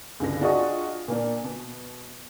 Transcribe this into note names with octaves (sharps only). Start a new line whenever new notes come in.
C#2 G2 D3 A#6
D4 F4 F#4 G#4 D#5 C#6
A#2 A#3 D4
B2